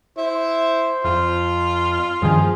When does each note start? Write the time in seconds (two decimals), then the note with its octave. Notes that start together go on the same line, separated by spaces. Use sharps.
0.18 E4 C5
1.04 F2 F4
2.22 G2 D#3 F3 G#4